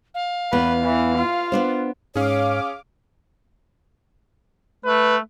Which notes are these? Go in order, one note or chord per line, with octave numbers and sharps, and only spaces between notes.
F5
E2 B3 B4
E3
F4
B3 D4 C5
G#2 C#4 G#4 C#5 F5 D6
A3 B4